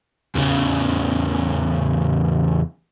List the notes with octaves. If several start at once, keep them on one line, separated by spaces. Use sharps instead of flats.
E2 C#3